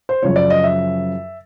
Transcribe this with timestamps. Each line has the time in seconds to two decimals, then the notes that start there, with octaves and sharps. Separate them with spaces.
0.09 C5
0.22 F#2 C#3 F3 C#5
0.36 D5
0.50 D#5
0.64 E5